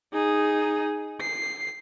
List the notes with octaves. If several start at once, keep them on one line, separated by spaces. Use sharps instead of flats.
D#4 G#4
C7